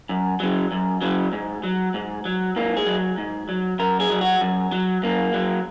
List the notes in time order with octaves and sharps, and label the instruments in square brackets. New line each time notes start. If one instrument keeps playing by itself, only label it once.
[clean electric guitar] F#2
C#3 F#3
F#2
C#3 F#3
G#2
F#3
G#2
F#3
G#2 A#3
G#4
F#3
G#2
F#3
F#2 A#4
G#4
F#3
F#4
F#2
F#3
F#2 A#3
F#3